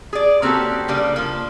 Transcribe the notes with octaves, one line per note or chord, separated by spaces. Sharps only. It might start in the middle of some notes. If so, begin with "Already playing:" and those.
G#4 D5
A#3 C4 C#4 F#4 G4 A4
C#3 G3 A#3 D4
F3 A#3